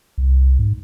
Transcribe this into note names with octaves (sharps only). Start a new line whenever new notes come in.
C2
G#2